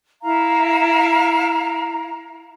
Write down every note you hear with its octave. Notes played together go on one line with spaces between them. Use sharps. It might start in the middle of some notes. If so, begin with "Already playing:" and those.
E4 F5 A#5